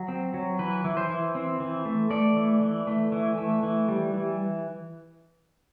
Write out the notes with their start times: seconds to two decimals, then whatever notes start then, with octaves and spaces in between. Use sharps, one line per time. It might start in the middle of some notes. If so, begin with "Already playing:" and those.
Already playing: F#3
0.08 C4
0.34 F#3
0.59 E3 B4
0.84 E3
0.97 C5
1.09 E3
1.35 C4
1.60 E3
1.85 A3
2.10 A3 D5
2.36 E3
2.62 E3
2.87 A3
3.12 E3
3.38 A3
3.63 E3
3.88 G3
4.14 E3